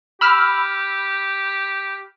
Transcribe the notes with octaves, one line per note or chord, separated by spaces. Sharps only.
G4 B5 E6 F6